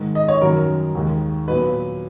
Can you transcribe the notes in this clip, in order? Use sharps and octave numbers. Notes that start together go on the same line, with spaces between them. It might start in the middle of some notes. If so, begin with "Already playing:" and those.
Already playing: G#2 D#3 G#3
D#5
C#5
F#2 D#3 F#3 A#4
D#2 D#3 G#3
A#2 F#3 B3 B4